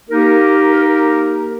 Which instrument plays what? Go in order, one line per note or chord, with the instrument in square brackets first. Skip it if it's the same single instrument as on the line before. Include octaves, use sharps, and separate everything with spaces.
[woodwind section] A#3 D#4 G4 A#4